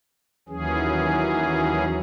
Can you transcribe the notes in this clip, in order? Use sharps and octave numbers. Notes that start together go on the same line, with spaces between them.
D#2 E3 F#3 C#4 G#4